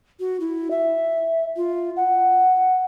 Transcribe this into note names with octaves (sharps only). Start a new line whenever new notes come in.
F#4
E4
E5
F4
F#5